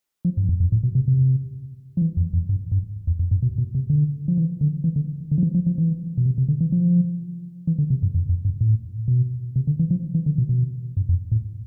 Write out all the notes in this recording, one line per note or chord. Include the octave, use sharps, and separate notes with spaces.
F3
G2
F2
F2
A2
B2
C3
C3
F3
E3
F2
F2
G2
G2
E2
F2
G2
B2
B2
C3
D3
F3
E3
D3
E3
D3
D3
F3
E3
F3
F3
E3
B2
C3
C3
D3
E3
F3
E3
D3
C3
G2
F2
F2
G2
A2
B2
C3
D3
E3
F3
E3
D3
B2
B2
G2
F2
A2